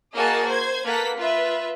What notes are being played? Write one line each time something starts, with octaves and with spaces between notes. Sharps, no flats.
A#3 F#4 G#4 D#5 G#5 A5
C5 G#6
A#3 A4 B4 F#5 B6
F4 B4 E5